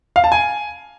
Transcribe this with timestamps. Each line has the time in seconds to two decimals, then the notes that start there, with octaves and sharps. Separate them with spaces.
0.16 F5
0.24 A5
0.32 G#5